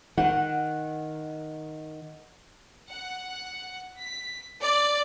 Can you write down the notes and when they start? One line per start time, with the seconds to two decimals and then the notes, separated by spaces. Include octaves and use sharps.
0.18 D#3 F#5
2.90 F#5
3.98 B6
4.61 D5